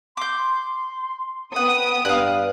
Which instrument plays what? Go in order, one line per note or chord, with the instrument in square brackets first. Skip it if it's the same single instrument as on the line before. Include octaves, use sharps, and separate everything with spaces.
[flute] C6 [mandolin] D6 G6
[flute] C6
[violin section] B3 D#6 [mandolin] F#5 [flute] G5
[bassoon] G2 [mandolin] F5 F#6